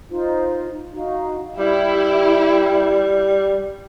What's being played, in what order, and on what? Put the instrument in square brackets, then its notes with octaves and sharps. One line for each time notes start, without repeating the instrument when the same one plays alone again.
[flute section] D#4 F4 C5
D#4 F#4 F5
[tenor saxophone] G3 [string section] E4 G4